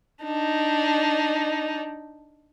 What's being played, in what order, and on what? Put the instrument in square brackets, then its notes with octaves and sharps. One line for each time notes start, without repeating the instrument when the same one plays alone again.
[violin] D4 D#4